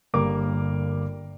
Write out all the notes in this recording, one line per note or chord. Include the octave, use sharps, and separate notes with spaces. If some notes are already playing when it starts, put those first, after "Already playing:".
G1 G3 A#3 A#4 D6